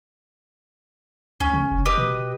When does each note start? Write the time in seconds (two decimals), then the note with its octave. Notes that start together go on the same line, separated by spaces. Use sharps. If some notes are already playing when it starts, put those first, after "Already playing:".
1.40 C#2 C#4
1.53 C#3
1.71 F1
1.86 G4 B4 D#5
1.98 B2